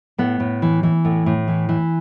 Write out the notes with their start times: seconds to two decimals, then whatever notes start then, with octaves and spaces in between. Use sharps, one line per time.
0.18 A2 B3
0.40 A2
0.62 E3
0.83 E3
1.05 A2
1.26 A2
1.48 E3
1.69 E3